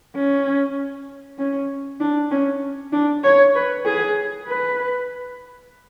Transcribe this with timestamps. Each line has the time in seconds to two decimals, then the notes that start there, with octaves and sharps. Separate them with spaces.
0.15 C#4
1.38 C#4
2.00 D4
2.31 C#4
2.93 D4
3.24 C#5
3.55 B4
3.85 G#4
4.47 B4